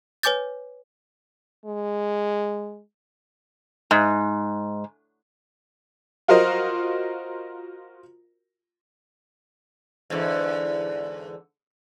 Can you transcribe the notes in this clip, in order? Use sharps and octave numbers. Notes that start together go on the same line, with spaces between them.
B4 C#5 G#5 D6 G6 A6
G#3
G#2
F4 F#4 A#4 C5 D#5
E2 G#2 D3